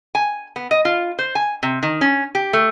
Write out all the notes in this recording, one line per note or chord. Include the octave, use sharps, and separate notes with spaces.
G#5
B3
D#5
F4
C5
G#5
C3
D#3
C#4
G4
A3